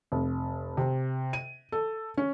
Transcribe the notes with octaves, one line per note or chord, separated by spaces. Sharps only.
F1
C3
D#7
A4
C#4